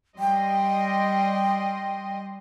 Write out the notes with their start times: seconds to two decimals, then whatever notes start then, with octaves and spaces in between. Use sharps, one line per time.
0.19 G3 D#5 G5 C6